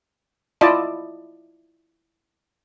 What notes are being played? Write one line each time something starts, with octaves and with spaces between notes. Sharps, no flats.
E4 F4 D5 D#5 A5